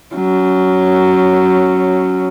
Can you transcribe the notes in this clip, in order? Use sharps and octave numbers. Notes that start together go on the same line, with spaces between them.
F#3 C#4